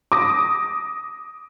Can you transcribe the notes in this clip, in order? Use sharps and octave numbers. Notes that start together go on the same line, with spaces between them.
D6 D#6 A#6